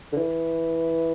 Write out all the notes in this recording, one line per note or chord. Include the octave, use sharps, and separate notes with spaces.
D3
E3